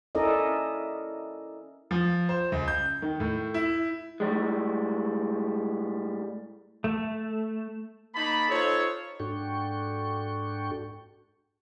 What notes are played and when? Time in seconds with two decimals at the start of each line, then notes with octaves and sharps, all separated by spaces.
0.15 C#4 E4 A4 A#4 D5 D#5
1.91 F3
2.29 C5
2.52 C#2
2.68 G6
3.02 D#3
3.20 A2
3.54 E4
4.20 A2 G3 G#3
6.84 A3
8.15 A#3 D#4 A5 B5
8.49 D#4 F4 A4 C5 C#5
9.20 G#2 D4 F#4 A4 G5 C#6